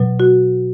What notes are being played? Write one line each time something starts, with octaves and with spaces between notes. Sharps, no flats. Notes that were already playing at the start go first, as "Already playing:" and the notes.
Already playing: B2 F#3
F#4